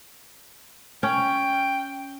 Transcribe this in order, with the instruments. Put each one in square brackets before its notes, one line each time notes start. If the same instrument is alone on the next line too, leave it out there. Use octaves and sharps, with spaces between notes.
[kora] C#4 [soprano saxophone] G5